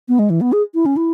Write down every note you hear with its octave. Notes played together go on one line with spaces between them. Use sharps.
B3
G#3
E3
B3
G#4
E4
C#4
E4